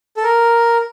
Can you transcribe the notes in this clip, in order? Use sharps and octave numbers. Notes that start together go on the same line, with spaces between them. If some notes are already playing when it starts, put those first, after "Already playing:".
A4
A#4